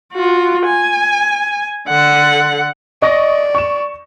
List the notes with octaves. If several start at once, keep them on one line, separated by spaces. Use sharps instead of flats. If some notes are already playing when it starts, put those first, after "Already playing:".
F4 F#4
G#5
D3 F#5
D5 D#5 C#6 A#6
C#6 E7